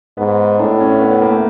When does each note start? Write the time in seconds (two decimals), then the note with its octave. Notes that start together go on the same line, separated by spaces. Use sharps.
0.17 G#2 B3
0.59 A2 D4
0.80 C#4
1.01 B3
1.11 B3
1.22 A#3
1.32 A3